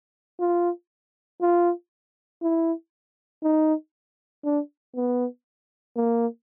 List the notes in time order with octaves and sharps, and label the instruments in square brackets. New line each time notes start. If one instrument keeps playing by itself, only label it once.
[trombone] F4
F4
E4
D#4
D4
B3
A#3